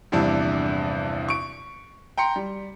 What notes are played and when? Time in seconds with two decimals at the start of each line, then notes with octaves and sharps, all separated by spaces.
0.12 A#1 E2 G2 C3 D4 E4
1.29 C#6 D7
2.17 G5 A#5 C6 C#7
2.36 G3